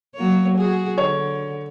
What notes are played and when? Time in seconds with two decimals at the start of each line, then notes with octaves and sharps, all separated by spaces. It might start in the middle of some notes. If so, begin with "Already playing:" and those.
0.15 F#3 A#3 C#5
0.57 F#4 G#4
0.98 D3 C#5